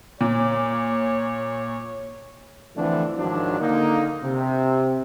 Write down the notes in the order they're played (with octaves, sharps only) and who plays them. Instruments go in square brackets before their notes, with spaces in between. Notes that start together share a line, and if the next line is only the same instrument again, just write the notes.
[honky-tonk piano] A#2 [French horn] C#5
[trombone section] D3 E3 F3 A3 C4 D4
G#2 D#3 F3 F#3 D4
D3 A#3 D#4
C3